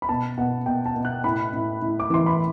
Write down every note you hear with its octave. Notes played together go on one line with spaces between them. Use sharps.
B5
B2 A5
B2 F#5
B2 G5
A5
B2
F#6
A2 B5
A2
A2
D6
E3 C6
B5